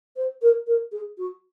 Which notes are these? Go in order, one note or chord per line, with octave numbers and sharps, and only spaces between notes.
C5
A#4
A#4
G#4
F#4